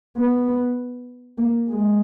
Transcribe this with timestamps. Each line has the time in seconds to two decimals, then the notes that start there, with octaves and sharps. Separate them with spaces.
0.17 B3
1.38 A#3
1.69 G#3